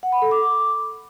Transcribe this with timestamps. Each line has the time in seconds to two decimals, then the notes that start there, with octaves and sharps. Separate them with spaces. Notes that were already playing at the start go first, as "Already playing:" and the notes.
0.03 F#5
0.12 B5
0.22 A4
0.31 D6